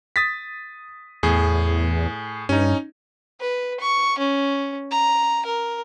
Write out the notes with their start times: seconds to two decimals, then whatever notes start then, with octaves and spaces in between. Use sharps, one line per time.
0.16 D#6 A6 B6
1.23 E2 A2 G#4
2.49 G2 C#4 D#4
3.40 B4
3.80 C#6
4.18 C#4
4.91 A#5
5.45 A#4